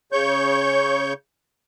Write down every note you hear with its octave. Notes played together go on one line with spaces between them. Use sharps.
C#3 C#5 C#6 G6